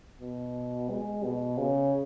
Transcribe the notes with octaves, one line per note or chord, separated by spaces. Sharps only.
B2
G#3
B2
C#3